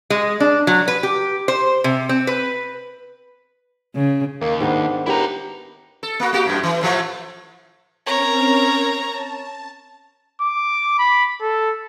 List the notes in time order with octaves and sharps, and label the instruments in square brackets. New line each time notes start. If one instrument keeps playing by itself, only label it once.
[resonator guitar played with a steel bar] G#3
D4
F#3
B4
G4
C5
C3
C4
B4
[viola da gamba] C#3
[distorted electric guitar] D#2 [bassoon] A#3
[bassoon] G#2 [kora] D#3 B3 D4
[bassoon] D#2 [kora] D4 G4 B4 [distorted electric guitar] E4 A#5
[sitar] A4
A#3 F#4
A#3 F#4 G4
F#2 A2
E3
A2 F3 A3
[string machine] C4 C#4 A#4 [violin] C#5 A#5
[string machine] A5
[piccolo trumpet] D6
B5
A4